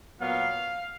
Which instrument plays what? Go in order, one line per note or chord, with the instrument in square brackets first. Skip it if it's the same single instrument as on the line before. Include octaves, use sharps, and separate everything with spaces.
[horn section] A#2 F#3 B3 F5